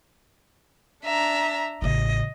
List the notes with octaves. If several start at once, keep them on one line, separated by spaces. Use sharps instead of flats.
D4 E5 A#5
A1 C#3 D#5